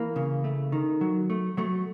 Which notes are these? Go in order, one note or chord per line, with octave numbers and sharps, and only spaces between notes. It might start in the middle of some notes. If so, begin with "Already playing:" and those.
Already playing: E3 A#3
C#3
A3
D#3
F#3
A3
F#3 A3